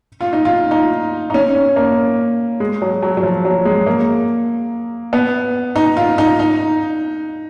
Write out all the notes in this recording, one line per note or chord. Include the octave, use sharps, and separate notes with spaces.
F4
D#4
F4
D#4
D#4
C#4
C#4
A#3
G#3
F#3
F#3
F#3
F3
F#3
G#3
A#3
B3
D#4
F4
D#4
D#4